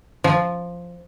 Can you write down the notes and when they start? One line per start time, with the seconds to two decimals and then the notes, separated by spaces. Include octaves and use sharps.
0.24 F3